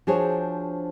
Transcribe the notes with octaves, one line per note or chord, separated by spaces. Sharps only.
F3 D4 F#4 G#4 C5 C#5